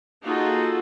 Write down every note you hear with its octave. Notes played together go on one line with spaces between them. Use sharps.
A#3 D#4 F4 F#4 G#4 A4